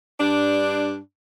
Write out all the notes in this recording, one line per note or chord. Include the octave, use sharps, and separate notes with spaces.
G2 D4